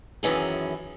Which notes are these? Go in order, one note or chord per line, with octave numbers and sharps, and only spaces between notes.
F#2 D#3 E3 C#4 G#4